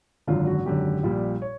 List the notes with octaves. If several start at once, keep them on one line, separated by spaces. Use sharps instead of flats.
G#1 F#2 D3 F4
F#4
G#1 F#2 D3 G4
A#1 A#2 G3
C#5